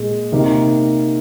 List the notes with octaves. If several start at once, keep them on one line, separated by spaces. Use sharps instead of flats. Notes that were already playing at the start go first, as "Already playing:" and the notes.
Already playing: A#2 G#3 G#4
C3 D#3 A#3 D#4